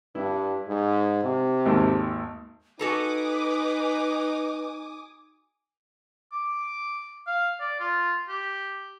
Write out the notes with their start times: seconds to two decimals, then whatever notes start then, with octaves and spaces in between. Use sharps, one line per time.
0.15 G2 E4
0.67 G#2
1.23 C3
1.65 G#1 D#2 A4
2.79 D#4 F#4 A4 B4 G#5 A#5 D6 D#6
6.32 D6
7.27 F5
7.60 D5
7.80 F4
8.29 G4